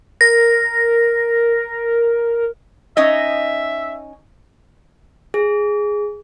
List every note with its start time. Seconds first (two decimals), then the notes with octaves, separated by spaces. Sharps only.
0.21 A#4 A#6
2.97 C#4 D#4 D#5 E5
5.34 G#4